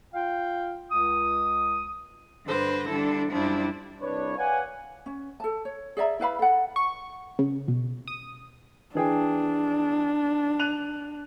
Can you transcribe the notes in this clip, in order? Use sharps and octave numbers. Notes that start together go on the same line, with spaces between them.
F4 F5 G5
C#2 D#6
G2 D3 D4 B4 C5 A#6
D3 G3 D4 E4 A4
F#2 F3 G3 D4 E4
C2 D4 B4 C#5
B4 C#5 D5 F5 F#5 G#5
C#4
A4 A5
C#5
G#4 D5 E5 A#5
E4 B4 F5 B5
A4 F#5
C#6
C#3
B2
D#6
E3 D4 G#4 G5
F#6 D#7 F7